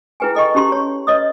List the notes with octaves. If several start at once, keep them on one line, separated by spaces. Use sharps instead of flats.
E4 G#4 B4 G5 G#5
A4 D#5 G5 C#6
C#4 D#4 G4 A#5 C6
C#5
B4 C#5 D#5 D#6